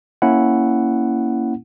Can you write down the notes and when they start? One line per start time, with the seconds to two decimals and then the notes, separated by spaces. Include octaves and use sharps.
0.22 A#3 C#4 E4 F#5